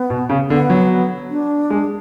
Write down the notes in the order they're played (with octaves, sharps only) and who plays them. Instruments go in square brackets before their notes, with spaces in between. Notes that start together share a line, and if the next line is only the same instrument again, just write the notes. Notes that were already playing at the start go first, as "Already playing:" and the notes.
Already playing: [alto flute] B3
[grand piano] B2
C#3
[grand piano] D3 [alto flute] B3
[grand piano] F#3
[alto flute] D4
[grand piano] G#3